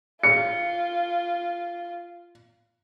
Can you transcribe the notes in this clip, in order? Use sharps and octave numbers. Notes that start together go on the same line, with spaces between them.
F4 C#7